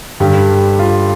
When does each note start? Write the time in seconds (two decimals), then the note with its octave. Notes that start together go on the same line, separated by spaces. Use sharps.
0.20 G2 D3 G3 G4
0.79 F4